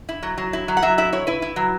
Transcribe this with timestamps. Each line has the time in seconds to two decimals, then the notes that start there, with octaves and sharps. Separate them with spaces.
0.09 E4
0.23 F#3
0.38 F#3
0.53 E4
0.68 F#3
0.77 F#5
0.82 F#3 E5
0.98 E4 E5
1.13 E4 C#5
1.27 E4 B4
1.42 E4
1.56 F#3